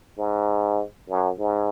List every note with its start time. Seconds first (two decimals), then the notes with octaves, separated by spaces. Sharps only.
0.18 G#2
1.09 F#2
1.39 G#2